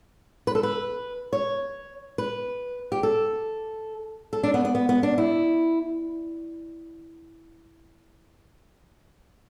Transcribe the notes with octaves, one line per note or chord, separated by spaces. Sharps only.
B4
A4
B4
C#5
B4
G4
A4
A4
D4
B3
B3
B3
B3
D4
E4